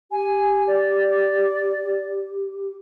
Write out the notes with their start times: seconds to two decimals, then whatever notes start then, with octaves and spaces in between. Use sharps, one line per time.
0.12 G4 G#5
0.67 D5